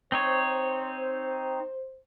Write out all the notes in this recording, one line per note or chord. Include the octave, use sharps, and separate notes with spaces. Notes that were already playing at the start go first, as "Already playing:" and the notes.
C4 D#4 C5 C#5